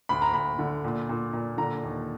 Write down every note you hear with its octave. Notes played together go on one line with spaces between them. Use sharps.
D2 B5
A#5
D2 B5
D3
A#2
A#2
A#2
D3 A#5
D#2